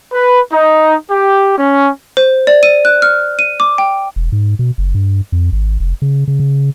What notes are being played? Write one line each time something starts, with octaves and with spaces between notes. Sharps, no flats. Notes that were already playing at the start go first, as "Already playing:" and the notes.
B4
D#4
G4
C#4
C5
D5
D#7
F#6
F6
D#7
D6
G5
E1
G#2
B2
F#1
G2
F2
G#1
F1
C#3
C#3
C#3